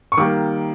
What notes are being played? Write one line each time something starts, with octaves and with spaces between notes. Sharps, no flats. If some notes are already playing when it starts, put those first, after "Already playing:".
C#6
D#3 G3 A#3 D6